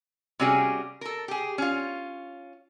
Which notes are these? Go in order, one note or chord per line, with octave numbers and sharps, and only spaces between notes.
C3 G3 C#4 F#4 G#4
A4 A#4
G4 G#4
C#4 F4